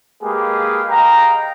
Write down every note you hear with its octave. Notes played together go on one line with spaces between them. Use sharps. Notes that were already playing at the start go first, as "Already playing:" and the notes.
G#3 A#3 G4 G#4 B4 F5
D#5 F5 G5 A#5